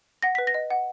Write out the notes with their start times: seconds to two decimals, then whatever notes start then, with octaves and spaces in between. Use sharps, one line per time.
0.22 F#5 A#6
0.35 B4 B6
0.47 A#6
0.54 D#5
0.70 F#5